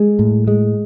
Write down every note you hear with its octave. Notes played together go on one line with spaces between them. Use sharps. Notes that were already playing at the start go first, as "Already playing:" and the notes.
Already playing: G#3
A2
G#3